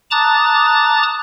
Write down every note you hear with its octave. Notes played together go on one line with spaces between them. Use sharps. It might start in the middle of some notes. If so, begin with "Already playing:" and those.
A5 A#5 D6 D#6 F#6 A6